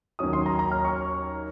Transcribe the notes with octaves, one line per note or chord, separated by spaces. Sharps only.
D#2 D#3 F#3 C#4 D#6
C6
A#5
A#5
F6
C#6